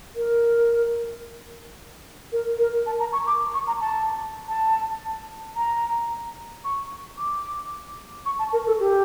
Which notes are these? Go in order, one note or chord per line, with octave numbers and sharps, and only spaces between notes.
A#4
A#4
A#4
A5
A#5
C#6
D6
C#6
A#5
A5
A5
A#5
C#6
D6
C#6
A5
A#4
A4
G4